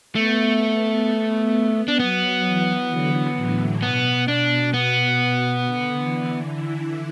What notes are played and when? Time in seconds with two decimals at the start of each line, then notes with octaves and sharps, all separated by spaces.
0.15 A3 B3
1.88 D4
1.99 F#3 B3
2.45 E3
2.91 D3
3.36 A2
3.82 B2 B3
4.28 D4
4.74 B3
5.65 D3
5.96 E3
6.27 D3
6.56 E4